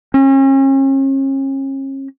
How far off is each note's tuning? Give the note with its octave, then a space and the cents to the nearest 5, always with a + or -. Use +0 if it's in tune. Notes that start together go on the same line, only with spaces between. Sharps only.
C#4 -40